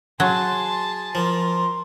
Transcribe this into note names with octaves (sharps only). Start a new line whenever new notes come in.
F#3 G#4 A5 C6
F3 A#4 C6